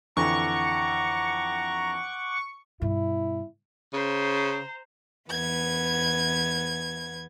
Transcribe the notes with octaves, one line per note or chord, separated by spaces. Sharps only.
F2 D3 E3 F#5 A#5 C#6 D6
G2 B2 E4
C#3 C5 A#5
E2 B3 G#6